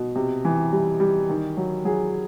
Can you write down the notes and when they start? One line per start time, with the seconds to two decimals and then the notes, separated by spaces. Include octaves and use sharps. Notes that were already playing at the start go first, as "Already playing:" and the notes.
Already playing: B2
0.15 C3
0.45 E3
0.72 G3
1.00 G3
1.29 D#3
1.57 F#3
1.85 F#3 G#4